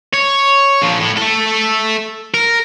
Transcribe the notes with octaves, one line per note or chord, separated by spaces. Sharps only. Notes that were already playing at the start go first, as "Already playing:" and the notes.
C#5
A#2 F3
A2
A3 A4
A#4